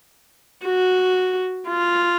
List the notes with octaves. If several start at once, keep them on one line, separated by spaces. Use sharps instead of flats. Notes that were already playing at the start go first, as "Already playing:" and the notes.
F#4
F4